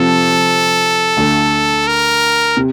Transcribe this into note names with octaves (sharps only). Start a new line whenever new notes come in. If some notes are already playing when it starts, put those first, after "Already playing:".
Already playing: C3 F3 C4 A4
D2 D3 A3
A#4
C3